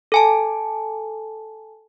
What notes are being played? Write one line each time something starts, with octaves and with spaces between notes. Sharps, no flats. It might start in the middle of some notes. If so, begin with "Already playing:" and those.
A4 G#5 A5